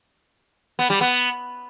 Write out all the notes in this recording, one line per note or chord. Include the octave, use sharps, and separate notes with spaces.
B3
G3
B3